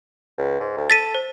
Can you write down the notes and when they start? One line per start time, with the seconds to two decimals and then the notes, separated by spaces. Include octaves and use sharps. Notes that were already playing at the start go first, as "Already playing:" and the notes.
0.38 C#2
0.60 G#2
0.77 D2
0.90 A4 A6 B6 D#7
1.15 C5